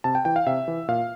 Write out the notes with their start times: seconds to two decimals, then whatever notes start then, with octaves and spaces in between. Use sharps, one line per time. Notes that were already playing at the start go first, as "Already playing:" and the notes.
0.04 C3 A5
0.15 G5
0.25 E3 G5
0.36 F5
0.46 C3 E5
0.68 E3
0.88 A#2 F5